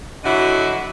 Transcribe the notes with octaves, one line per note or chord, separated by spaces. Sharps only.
D3 F#3 E4 F#4 D#5